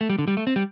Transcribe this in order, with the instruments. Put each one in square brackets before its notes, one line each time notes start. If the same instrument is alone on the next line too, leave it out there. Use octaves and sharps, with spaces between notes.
[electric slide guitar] A3
G3
D3
G3
A3
C4
G3